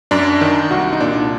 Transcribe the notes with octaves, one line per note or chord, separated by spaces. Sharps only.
F#2 D4
D#3
C2 F#4
D#4
A#2 D4